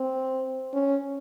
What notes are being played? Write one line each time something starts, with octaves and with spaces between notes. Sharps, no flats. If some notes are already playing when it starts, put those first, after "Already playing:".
Already playing: C4
C#4